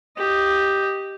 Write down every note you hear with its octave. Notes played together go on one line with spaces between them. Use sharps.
G4 D#5